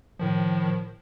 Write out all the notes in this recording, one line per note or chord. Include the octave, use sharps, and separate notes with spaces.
A2 D#3 F3